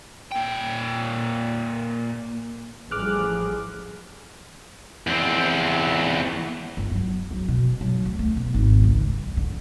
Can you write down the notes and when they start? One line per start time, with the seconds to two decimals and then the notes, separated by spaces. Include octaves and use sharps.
0.32 A#2 G5
2.91 A1 F3 G3 G#4 D6 F6 F#6
5.07 E2 C4
6.77 G1
6.91 F#3
7.31 F#3
7.48 B2
7.81 F#3
8.06 D2
8.19 A3
8.37 B2
8.54 G#1
8.84 C#2
9.09 G2
9.37 D3